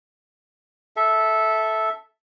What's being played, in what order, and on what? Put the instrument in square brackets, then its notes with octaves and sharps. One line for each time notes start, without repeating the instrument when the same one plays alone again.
[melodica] A4 E5